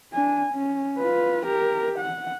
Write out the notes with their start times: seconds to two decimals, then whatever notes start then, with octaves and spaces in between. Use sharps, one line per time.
0.13 D4 G#5
0.53 C#4
0.98 F4 B4
1.46 G4 A#4
1.98 F#5